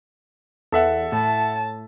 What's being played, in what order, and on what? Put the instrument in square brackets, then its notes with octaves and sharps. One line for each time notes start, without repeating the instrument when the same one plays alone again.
[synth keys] E2 [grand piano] A4 E5 F#5
[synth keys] A2 [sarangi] A5